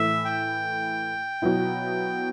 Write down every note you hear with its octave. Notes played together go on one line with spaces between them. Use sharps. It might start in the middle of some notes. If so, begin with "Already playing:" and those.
Already playing: A2 E3 A3 E4 E5
G5
B2 F#3 B3 E4